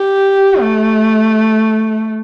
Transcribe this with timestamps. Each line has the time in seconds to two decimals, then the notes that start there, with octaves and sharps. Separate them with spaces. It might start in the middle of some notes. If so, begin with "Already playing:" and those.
Already playing: G4
0.61 A3